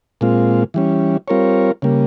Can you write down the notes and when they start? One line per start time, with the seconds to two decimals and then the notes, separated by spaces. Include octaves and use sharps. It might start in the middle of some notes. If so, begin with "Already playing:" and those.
0.21 A#2 G#3 C4 F4
0.74 E3 G3 C#4
1.28 G3 C4 F4 A#4 C#5
1.82 C#3 G3 A#3